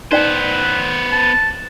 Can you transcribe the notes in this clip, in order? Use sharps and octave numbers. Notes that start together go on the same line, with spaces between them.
B3 D#4 B4 C5 D5 G5
A5